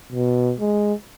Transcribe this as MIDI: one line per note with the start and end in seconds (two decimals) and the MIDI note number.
0.13 0.53 47
0.60 0.94 56